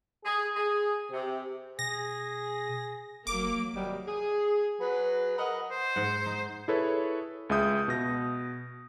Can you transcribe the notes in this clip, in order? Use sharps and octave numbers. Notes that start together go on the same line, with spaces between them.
G#4
G#4
C3
B2 G#4 A#6
F#1 F#3 A#3 D6
D#2 C3 D#3 F#3 G3
G#4
F#3 G#4 B4
A#4 B4 D#5 F#5
C5
G#2 F#5
D#4
E4 G#4 A4 B4 C#5
C#2 G#3 E5 D#6 G6
B2 A#6